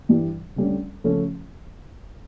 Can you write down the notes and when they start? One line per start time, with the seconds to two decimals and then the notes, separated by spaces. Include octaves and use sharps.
0.09 G2 E3 G3
0.56 D2 D3 G3 C#4
1.04 C#3 F3 A3 C#4